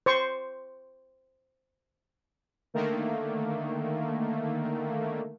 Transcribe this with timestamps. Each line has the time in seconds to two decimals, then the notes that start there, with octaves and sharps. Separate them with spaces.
0.06 C5 C#6
2.74 D3 D#3 A3 A#3